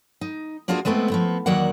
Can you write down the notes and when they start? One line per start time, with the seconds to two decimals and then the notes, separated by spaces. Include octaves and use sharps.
0.21 D#4
0.68 A#3 D4 F4 F#4 G#4 C5
0.85 G#3 A3 B3 C4 E4
1.10 F3 B3 C4
1.46 E2 D#3 F#3 A#3 D5 F#5